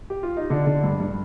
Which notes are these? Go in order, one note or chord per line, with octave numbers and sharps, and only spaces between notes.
G4
F4
D#4
D3 D4
D3
G2
G2